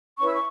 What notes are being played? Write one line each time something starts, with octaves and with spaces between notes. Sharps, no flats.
C#4 E4 B4 C#6
E6
C#6